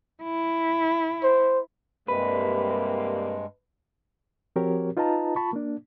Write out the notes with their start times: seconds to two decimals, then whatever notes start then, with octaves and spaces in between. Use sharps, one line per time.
0.23 E4
1.23 C5
2.08 G2 C3 G3 G#3 A#3 B4
4.56 F3 C4 F#4 G4 A#4 C#5
4.97 D#4 F4 B4 D#5 A5 A#5
5.36 F4 A5 B5 C#6
5.53 A#3 D4